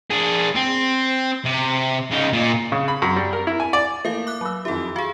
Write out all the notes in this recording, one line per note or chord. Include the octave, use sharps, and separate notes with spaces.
D4 G#4
C4
C3
C#3 D#4
A#2
C#3
B5
F#2
G3
A#4
E4
G#5
D5
A3 A#3 E4 A#4 F5
D6 F#6
F#3 B5 E6
F2 D#3 E4 G4 A4
F#4 G#4 F5